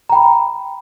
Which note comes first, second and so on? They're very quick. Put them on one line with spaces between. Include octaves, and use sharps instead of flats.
A#5 G5 B5